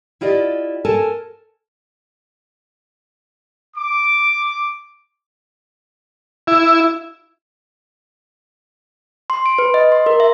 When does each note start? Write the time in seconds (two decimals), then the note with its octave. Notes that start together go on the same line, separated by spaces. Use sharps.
0.21 E4 F4 G4 D5 D#5
0.85 A4 A#4 G#5 A5
3.77 D6
6.47 E4
9.30 C6
9.46 D7
9.58 B4
9.74 D#5
9.92 C6
10.06 A#4
10.20 E5